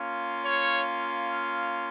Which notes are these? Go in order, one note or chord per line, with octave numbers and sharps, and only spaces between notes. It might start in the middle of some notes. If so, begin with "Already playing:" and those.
Already playing: A#3 C#4 F4
C#5